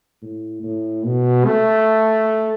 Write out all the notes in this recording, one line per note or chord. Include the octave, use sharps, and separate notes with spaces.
A2
A2
B2
A3